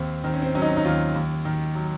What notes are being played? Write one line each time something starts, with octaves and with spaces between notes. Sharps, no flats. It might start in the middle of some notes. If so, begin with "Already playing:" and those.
Already playing: D#2 C4
D#3 C4
C#4
C4
F#3 C#4
D#4
C#4
D#4
D#2 F4
D#2
D#3
F#3